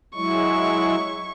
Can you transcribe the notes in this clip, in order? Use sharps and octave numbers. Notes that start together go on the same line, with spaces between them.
F#3 G#3 E4 C#6